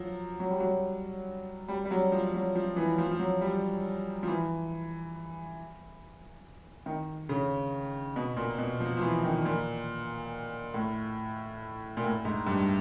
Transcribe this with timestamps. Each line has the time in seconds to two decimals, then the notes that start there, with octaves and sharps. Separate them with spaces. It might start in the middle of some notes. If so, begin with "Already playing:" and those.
Already playing: F3 F#3
0.40 F#3
0.50 G3
0.60 F#3
1.68 G3
1.85 G3
1.91 F#3
2.12 F3
2.34 F#3
2.55 F3
2.76 E3
2.98 F3
3.11 F3
3.19 F#3
3.41 G3
4.23 F3
4.28 E3
6.86 D#3
7.29 C#3
8.16 B2
8.37 A#2
8.58 B2
8.80 F3
8.97 F3
9.01 E3
9.23 D#3
9.45 A#2
10.74 A2
11.97 A#2
12.04 A2
12.25 G#2
12.47 G2